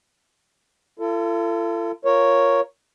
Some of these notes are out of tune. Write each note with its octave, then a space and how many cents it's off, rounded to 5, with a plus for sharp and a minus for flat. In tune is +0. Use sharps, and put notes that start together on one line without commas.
F4 -45 A4 +25
F4 +0 A#4 +0 C#5 +0